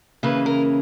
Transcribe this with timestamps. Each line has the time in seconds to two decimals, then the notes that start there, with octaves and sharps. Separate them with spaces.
0.23 C#3 E3 A#3 C#4 B4
0.46 A#4